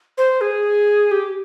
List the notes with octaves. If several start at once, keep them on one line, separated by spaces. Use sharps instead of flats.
C5
G#4
G4